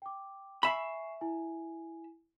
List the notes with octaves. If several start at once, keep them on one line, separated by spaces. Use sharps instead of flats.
G5 D6
E5 G#5 B5 C#6 C7
E4 G#5